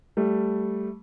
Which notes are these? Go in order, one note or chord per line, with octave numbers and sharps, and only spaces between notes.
G3 A3